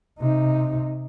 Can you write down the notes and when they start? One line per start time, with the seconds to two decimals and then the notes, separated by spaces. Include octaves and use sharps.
0.20 C3 D#4